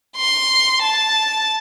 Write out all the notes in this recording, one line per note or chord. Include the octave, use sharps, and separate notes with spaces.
C6
A5